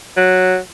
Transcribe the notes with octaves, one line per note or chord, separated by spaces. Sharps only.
F#3